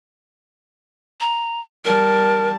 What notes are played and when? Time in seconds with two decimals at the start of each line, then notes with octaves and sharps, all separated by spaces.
1.21 A#5
1.85 G3 A#4 A5